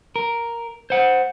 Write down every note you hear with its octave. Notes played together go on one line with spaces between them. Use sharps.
A#4
C5 F#5